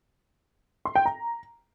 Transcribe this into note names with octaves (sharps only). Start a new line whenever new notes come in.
C6
G5
A#5